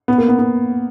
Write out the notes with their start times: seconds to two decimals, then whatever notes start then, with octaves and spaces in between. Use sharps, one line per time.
0.08 B3
0.18 A#3
0.28 B3
0.39 B3